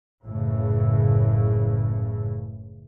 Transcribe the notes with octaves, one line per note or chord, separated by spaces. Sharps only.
F#1 A2 C#3 E3